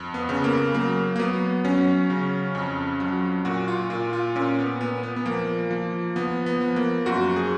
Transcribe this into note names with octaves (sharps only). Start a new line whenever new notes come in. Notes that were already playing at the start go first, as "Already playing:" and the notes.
Already playing: F2
B3
C#3
A#3
F#3 A#3
A#3
F#3 B3
F#3 C#4
C#3
F2
F#3
A#2 F#4
F4
A#2 F4
F4
A#2 C#4
B3
A#2 B3
B3
B3
F3 A#3
F3
F3 B3
B3
F3
A#3
F#2 F#4
G#4